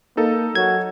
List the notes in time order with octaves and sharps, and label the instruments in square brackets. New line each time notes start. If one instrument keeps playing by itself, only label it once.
[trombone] A#3 [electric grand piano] D#4 A4
[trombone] F#3 [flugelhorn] F#4 [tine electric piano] G#6